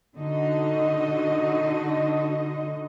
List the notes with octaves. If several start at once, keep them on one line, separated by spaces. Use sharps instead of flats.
D3 D#4 F#4 D#5